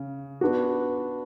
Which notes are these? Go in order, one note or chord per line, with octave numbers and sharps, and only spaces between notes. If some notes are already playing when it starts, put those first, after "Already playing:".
Already playing: C#3
B3 D4 F#4